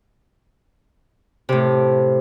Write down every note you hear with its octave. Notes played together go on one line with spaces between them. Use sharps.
A2 C3